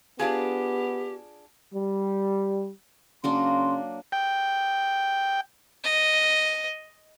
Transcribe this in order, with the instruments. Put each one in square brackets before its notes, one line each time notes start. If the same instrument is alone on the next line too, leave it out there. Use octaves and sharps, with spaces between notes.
[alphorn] B3 [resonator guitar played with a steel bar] D4 F4 G#4 [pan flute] G4
[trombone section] G3
[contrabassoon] C#3 [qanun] F#3 A#3 D4 [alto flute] C6
[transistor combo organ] G5
[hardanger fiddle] D#5